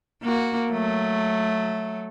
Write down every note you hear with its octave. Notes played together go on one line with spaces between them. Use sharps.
A#3 F#4
F#3 A3